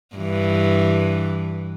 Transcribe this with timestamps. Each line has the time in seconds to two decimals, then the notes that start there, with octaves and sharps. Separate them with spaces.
0.16 G2 E3